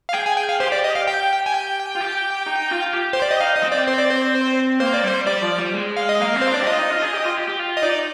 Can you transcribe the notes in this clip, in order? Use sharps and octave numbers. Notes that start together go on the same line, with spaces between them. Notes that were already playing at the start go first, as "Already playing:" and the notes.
F5
G#4 G5
G#5
G5
F5
G4 C5
D5
D#5
F5
G5
G#5
G5
F4
G4
D#4
F4
G4
C5
D5
D#5
D#4 F5
D#5
C4
D5
C5
D5
C5
A#3 C5
D5
G3 C5
G3 D5
F3
G3
G#3
F5
D#5
A#3 F5
C4
C5
D4 D5
G4
F4 D#5
D#4
F4
G#4
G4
F4
G4
G4
F4
D#5
D#4 D5